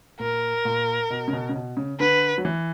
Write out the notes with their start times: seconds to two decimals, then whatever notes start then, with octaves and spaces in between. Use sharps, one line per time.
0.20 A#2 A#4
0.65 A#2
1.10 B2
1.28 C#3
1.33 B2
1.49 C#3
1.55 B2
1.77 C#3
2.00 D3 B4
2.38 F#3
2.45 E3